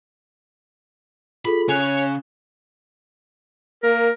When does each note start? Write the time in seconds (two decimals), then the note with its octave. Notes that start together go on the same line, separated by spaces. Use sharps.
1.45 F4 G#4 A4 B5
1.69 C#3 C#5 G#5 F#6
3.83 A#3 A#4